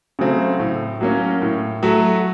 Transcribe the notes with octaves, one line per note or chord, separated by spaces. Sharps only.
C#3 F#3 A3 C4
A2
F#3 A#3 C#4
A2
F#3 A3